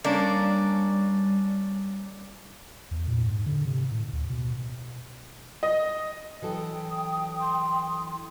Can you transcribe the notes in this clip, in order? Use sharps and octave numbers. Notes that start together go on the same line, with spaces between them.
G3 A#3 C#4 D4 D5
E2
A#2
G#2
D3
C3
A2
D2
B2
D#5
E3 F#3 A4 G5 D#6
C6